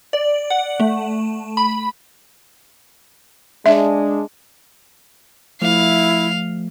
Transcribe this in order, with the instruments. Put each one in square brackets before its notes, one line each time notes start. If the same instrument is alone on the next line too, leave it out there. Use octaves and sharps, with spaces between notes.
[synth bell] D5
F#5
A3
B5
[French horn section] G#3 D4 [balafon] E5
[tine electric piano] F3 A3 [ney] E4 [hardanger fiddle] F5